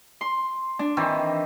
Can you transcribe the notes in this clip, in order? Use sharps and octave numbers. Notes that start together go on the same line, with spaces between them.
C6
D4
D#3 E3 C4